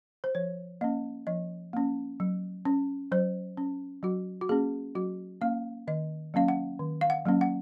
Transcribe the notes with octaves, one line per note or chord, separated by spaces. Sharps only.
C5
F3 C#5
A#3 C#4 D#5
F3 D#5
A#3 C#4
F#3
C#4
F#3 C5
C#4
F#3 F#4
F#4
A#3 C#4 G#4
F#3 F#4
A#3 C#4 F5
D#3 D#5
F#3 A#3 C#4 F5
F#5
D#3
F5
F#5
F#3 A#3 C#4
F#5